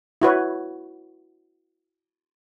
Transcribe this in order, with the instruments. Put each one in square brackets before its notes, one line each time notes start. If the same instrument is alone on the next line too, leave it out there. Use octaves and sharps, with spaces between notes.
[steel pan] E4 F#4 B4 C#5